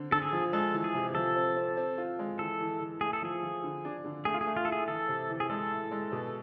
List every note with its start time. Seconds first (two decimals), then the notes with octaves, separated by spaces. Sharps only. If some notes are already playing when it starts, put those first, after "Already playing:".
Already playing: D3 C4
0.11 D3 A4
0.22 G#4
0.32 F3
0.53 G#3 A4
0.74 E3
0.84 G#4
0.94 C3
1.15 F3 A4
1.36 C4
1.56 C4
1.77 C4
1.98 F4
2.19 G#3
2.39 E3 A4
2.60 E3
2.81 E3
3.01 A3 G#4
3.13 A4
3.22 F3 G#4
3.43 F3
3.63 D3
3.85 D4
4.04 D3
4.25 A3 G#4
4.34 F4
4.41 G#4
4.46 A3
4.56 F4
4.65 E4 A4
4.72 G#4
4.88 E3 A4
5.08 C3
5.29 E3
5.40 G#4
5.50 G#3 A4
5.71 A2
5.91 G#3
6.12 B2